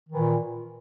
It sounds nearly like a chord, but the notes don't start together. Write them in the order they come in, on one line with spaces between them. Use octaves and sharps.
D#3 E3 A#2